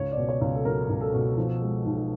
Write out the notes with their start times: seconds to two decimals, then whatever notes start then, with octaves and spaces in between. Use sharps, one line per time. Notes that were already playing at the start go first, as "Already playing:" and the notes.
Already playing: C#2 C#5
0.12 D5
0.17 B2
0.29 C#5
0.41 C#2
0.55 A4
0.65 F#3 A#4
0.89 C#2
1.01 A4
1.14 B2
1.37 F3
1.61 G#3
1.85 B1